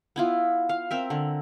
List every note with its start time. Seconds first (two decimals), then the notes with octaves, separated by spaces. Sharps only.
0.16 B3 E4 F4
0.69 F5
0.91 C4 A#4 E5
1.10 D3